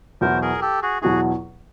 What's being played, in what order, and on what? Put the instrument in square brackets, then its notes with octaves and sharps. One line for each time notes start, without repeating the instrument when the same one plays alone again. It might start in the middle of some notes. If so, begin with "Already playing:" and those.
[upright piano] E2 B2 F#3 B3 E4 [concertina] A#4 C5
[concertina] G#4 A#4
G4 A4
F#4 G#4
[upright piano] E2 B2 F#3 B3 E4 [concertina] F#4 G#4